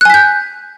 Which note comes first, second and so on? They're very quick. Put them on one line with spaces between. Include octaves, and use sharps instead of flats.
F#6 G#5 B6 G6